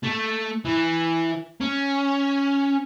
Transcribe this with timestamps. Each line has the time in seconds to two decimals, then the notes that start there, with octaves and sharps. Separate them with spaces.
0.03 A3
0.65 E3
1.61 C#4